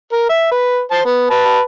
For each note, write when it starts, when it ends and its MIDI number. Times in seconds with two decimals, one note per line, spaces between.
0.12 0.27 70
0.29 0.46 76
0.51 0.81 71
0.91 1.01 72
0.91 1.01 81
1.05 1.29 59
1.30 1.60 71
1.30 1.60 81